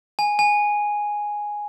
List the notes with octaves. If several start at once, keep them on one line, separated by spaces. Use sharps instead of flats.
G#5
G#5